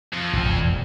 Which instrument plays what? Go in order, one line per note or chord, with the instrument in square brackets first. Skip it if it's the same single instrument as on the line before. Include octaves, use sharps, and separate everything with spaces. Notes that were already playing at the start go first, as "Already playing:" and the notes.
[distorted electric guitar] F2
[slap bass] G#1
E1
E2